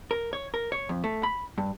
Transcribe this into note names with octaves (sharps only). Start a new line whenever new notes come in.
A#4
C#5
A#4
C#5
F2
A3
B5
G2